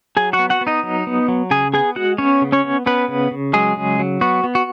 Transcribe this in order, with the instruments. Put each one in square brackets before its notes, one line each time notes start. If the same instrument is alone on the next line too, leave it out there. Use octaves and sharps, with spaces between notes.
[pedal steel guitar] F#3 G#4 G#5
F#4 F#5
B3
F#4 F#5
B3
D#4 D#5
F#3
B3
F#3
C#3 G#4 G#5
B3 G#4 G#5
G#3 F#4 F#5
B3 C#4 C#5
C#3
C#4 C#5
B3
B3 C#4 B4
C#3
C#3
F#3 G#3 G#4
C#3
F#3
B3 F#4
B3
F#4